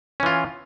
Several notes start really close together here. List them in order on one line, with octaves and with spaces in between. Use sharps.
C#4 E3 F4